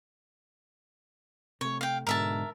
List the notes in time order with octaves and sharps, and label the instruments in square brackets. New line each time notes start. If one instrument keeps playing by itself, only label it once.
[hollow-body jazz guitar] C3 A3 [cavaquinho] C#5
[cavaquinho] F5 G5
[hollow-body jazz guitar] G#2 B2 D3 [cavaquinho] A#4 E5 A5